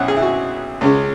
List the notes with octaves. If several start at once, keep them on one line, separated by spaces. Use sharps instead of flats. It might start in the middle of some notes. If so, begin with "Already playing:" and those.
Already playing: B1 B2 C#4 E4 F#5
G#4
E4
F#4
C#2 C#3 G#3 C#4